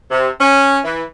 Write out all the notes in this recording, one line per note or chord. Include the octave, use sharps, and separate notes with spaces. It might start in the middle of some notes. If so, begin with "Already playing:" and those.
C3
C#4
E3